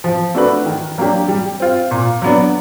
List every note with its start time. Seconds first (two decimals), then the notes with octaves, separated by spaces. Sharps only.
0.04 F3
0.35 A3 D4 F#4 B4
0.66 D#3
0.98 F#3 A#3 D4 G4
1.28 G3
1.60 C4 F4
1.91 A#2
2.22 F#3 B3 D4